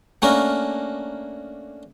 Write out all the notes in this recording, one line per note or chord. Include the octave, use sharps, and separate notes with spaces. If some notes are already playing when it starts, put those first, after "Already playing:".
A3 A#3 C#4 D4 F#4 A#4